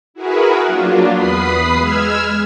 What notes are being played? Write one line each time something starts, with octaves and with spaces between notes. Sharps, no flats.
E4 F#4 G#4 A#4 B4
F#3 A#3 D4 F4
E2 B4 B5 D#6 C7
G#3 E6 F6 G#6